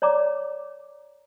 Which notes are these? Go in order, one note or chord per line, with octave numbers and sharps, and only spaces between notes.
C#5 D5 A#5 D6